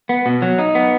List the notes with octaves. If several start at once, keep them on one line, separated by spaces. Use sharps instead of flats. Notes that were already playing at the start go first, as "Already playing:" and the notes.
B3
B2
F#3
D#4
B3